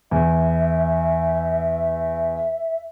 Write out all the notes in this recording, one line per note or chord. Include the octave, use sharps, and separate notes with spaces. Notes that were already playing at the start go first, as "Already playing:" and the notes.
E2 E5